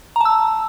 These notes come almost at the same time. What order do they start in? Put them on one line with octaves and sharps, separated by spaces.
A#5 A5 E6